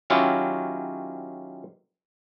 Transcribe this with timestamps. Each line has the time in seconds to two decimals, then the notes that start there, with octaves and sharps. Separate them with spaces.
0.10 D#3 F#3 C#4 E4 F4 G4